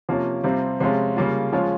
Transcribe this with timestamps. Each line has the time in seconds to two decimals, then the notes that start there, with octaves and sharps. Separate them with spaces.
0.09 C3 F3 A#3 C#4 F4
0.44 C3 G3 C4 F4
0.80 C3 F3 G#3 C#4 F4
1.16 C#3 G3 A#3 F4
1.53 F3 G#3 C#4 F4